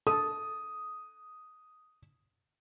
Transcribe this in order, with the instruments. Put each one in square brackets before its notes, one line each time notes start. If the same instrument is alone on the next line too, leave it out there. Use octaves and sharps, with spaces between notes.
[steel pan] A4 [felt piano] D#6